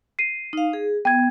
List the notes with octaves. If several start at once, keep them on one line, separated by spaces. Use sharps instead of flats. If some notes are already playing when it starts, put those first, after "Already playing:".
C7 D#7
D#4 F5
G#4
B3 G5 G#6